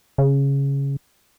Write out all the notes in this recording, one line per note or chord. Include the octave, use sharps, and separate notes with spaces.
C#3